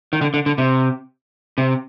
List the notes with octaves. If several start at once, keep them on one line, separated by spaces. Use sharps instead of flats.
D#3
D3
D3
D3
C3
C3